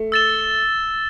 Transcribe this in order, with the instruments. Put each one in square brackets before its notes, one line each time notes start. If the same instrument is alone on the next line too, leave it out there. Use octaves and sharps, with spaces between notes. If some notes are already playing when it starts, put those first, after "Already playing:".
Already playing: [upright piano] A3
[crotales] E6 A6 E7 G7